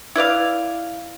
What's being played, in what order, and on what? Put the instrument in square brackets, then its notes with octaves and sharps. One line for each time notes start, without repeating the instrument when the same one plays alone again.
[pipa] E4 B4 D5 F5